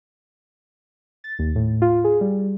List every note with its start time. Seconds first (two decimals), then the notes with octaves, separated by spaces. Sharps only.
1.24 A6
1.39 D#2
1.56 A2
1.82 F4
2.04 G#4
2.21 G3